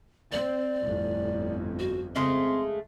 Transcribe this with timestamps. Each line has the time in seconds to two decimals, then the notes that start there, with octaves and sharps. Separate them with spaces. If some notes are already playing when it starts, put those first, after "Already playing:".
0.32 C4 D5
0.84 G1 F2 A2
1.79 F#4
2.16 C#3 G#3 A3 C4 C6